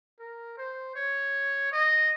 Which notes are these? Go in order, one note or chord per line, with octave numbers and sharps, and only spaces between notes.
A#4
C5
C#5
D#5